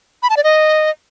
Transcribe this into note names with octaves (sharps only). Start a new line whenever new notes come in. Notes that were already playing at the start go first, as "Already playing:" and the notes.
B5
A5
D5
D#5